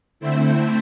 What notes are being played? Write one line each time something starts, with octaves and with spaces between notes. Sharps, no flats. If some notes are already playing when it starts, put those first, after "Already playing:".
D3 A3 C4 E4 C5